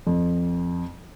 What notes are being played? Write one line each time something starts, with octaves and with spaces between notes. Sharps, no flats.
F2